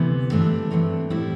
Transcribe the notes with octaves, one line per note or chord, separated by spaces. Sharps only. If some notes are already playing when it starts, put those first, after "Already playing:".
Already playing: D2 C3 E3 B3
G2 E3 A3 C4 D4
G2 E3 A3 C4
A2 G3 C4 E4